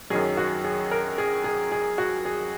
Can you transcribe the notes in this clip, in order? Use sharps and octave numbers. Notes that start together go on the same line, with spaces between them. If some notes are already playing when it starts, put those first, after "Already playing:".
F#2 D#3 F#3 G#4
F#4
G#4
A#4
G#4
G#4
G#4
F#4
G#4